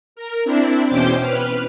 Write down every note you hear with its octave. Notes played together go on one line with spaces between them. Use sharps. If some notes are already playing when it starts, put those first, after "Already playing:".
A#4
C4 D4 E4
E2 B2 C#4 C5 G5 D6
B4 F6